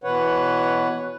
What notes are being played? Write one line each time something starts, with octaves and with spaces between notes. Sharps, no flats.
B2 E3 B4 C#5 F#5